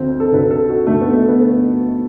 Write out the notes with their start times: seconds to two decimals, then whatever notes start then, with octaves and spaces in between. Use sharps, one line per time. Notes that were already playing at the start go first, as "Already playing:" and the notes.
Already playing: D2 D3 C4
0.20 A4
0.32 D2 D3 B4
0.51 A4
0.69 F#4
0.87 D2 D3 A3
1.01 B3
1.15 A3
1.29 B3
1.42 B3